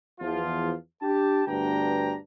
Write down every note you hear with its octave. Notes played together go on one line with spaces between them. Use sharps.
E2 F3 F4
D4 G4 A5
D2 G2 B3 D4 G5 A#5